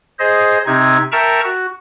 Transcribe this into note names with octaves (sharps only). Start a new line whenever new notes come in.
G#4 C5 D#5
C3 C4 D#4 G#6
A#4 E5 G5 A5 A#5 C#6
F#4